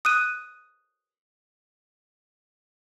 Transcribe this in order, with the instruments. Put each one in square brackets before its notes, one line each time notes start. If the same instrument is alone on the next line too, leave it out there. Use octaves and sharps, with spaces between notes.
[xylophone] D#6 F#6 D#7